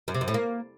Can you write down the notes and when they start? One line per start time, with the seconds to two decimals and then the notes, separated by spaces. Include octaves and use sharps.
0.08 F#2
0.14 C3
0.21 F#2
0.28 A2
0.34 A#3